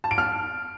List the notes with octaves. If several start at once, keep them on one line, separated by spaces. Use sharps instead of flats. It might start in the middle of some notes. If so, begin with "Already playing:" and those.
A5
D7
F6